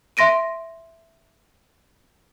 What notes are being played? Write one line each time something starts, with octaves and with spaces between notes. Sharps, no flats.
E5 C6 A#6 D7 D#7